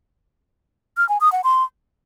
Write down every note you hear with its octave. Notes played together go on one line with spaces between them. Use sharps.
F6
G#5
D#6
F#5
C6